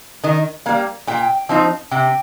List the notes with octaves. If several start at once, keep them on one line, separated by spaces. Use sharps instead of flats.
D#3 D#5
G3 A#3 F5
A#2 G5
F3 C4 D#4
C3 G5